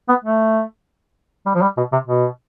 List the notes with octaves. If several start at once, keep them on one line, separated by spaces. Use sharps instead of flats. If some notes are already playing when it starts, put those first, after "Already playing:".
B3
A3
G3
F3
G3
B2
C3
B2